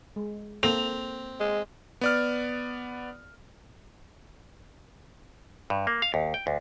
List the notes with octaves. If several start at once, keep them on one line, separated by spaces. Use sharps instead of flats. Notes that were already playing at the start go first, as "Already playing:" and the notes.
G#3
A#3 C4 A4 F7
G#3
B3 D5 F6
G2
A#3
F5
D#2
G5
D2